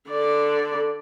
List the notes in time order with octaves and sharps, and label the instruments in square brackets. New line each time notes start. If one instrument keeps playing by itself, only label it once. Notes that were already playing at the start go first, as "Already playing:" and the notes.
[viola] D3 D5